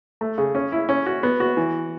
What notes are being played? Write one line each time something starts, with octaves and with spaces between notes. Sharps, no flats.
A3
C#3
C#4
E4
C#4
F#4
B3
F#4
E3